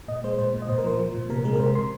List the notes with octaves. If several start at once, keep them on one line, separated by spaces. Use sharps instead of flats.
A#2 D#5
G#3 C5
A#2 C5
A#2
D#5
A#2 C5
A#4
F3 C5
F3
A#2
C3 A#4
G#3 A#4
A#4
C3 C5
C3 C6